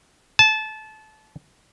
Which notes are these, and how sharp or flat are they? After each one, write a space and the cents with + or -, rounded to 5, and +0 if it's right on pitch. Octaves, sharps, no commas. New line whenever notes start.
A5 -25